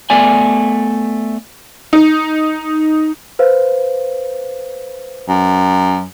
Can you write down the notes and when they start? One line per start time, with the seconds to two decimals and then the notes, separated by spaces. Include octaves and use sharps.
0.10 A3 B3 D5 G#5
1.93 D#4
3.39 B4 C5 F5
5.28 F#2